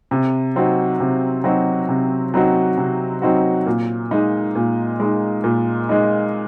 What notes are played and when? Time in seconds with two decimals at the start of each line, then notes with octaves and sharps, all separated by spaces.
0.11 C3
0.56 F#3 C4 D#4 F#4
1.00 C3
1.44 F#3 C4 D#4 F#4
1.89 C3
2.34 F#3 C4 D#4 F#4
2.77 C3
3.22 F#3 C4 D#4 F#4
3.66 A#2
4.11 G#3 D#4
4.55 A#2
5.00 G#3 D#4
5.44 A#2
5.89 G#3 D#4